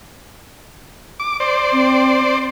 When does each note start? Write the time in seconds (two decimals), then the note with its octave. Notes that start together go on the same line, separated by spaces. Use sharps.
1.20 D6
1.40 C5 D5
1.73 C4